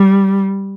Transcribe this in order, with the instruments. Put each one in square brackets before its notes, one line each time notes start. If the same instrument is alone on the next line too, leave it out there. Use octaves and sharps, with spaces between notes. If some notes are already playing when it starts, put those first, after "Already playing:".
Already playing: [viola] G3